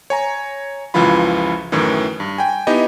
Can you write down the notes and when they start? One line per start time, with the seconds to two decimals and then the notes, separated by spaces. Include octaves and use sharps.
0.10 C#5 G#5 A#5
0.94 C#2 F#2 E3 F3 F4 B5
1.72 F#2 A2 D#3 E3
2.20 G2
2.38 G5 G#5
2.67 B3 D#4 E4 G4 D#5